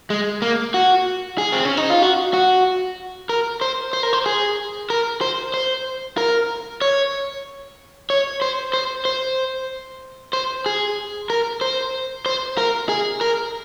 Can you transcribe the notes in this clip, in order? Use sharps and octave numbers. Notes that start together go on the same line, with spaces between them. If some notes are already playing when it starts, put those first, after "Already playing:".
G#3
A#3
F#4
G#4
C4
C#4
D#4
F4
F#4
F#4
A#4
C5
C5
A#4
C5
G#4
A#4
C5
C5
A#4
C#5
C#5
C5
C5
C5
C5
G#4
A#4
C5
C5
A#4
G#4
A#4